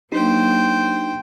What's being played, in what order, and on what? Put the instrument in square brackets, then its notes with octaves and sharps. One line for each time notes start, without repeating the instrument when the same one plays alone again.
[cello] F#3 A#3 [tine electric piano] D4 D#4 G4 [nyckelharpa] C5 G5